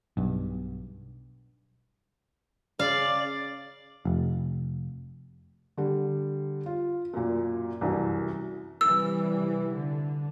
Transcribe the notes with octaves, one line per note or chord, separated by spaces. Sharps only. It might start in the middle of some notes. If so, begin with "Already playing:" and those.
B1 G2
C#3 D5 F5
F1
D3 G3
F4
F#2 A#2
C2 F#2 E3
C3 E3 G3 E6
D3